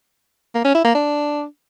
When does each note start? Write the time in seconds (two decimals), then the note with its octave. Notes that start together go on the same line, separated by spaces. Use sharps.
0.55 A#3
0.65 C#4
0.75 E4
0.85 A#3
0.95 D4